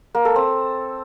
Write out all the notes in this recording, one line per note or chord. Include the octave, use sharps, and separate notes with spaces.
A#3
A4
C4